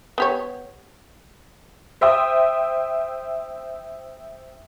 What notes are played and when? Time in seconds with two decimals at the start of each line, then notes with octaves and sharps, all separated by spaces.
0.18 B3 G4 C#5
2.01 C5 E5 G5 D#6